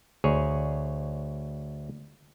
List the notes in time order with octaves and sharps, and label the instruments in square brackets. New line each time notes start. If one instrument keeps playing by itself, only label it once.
[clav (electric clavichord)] D2 G#4 C#5